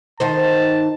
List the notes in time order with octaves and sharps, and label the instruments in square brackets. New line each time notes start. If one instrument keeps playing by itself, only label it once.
[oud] D#3 D#4 C5 [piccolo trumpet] A5